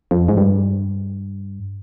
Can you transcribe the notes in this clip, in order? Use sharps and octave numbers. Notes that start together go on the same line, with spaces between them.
F2
G#2
G2